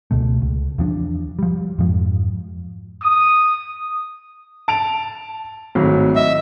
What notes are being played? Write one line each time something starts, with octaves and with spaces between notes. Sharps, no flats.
C#2 B2 A3
C#2
E2 F3 D4
F3 G3
F2 G#2 F3
D#6
A5 D7 F7
G#1 A2 F#3
D#5 E5